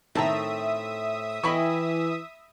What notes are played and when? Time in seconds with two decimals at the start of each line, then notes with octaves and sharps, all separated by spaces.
0.15 A2 D#3 C4 E5 G5 A5 A#5 D#6
1.44 E3 E4 D#5 G5 G#5 B5 C#6